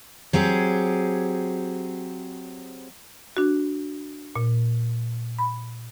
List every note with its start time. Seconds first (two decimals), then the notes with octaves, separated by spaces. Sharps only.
0.33 F#3 C4 G4 G#4
3.37 D4 F#4
4.36 A#2
5.38 B5